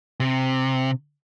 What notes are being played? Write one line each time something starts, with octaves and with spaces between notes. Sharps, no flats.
C3